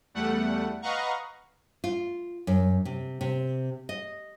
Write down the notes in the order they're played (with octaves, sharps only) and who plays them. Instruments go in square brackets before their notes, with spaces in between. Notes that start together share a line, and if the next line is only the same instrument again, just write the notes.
[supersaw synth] E2 G3 A3 F#5
B4 D#5 F5 F#5 A#5 C#6
[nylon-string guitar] F4
F#2
C3
C3
D#5